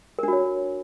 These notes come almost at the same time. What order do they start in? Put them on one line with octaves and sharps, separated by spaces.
A#4 D4 F#4 C#5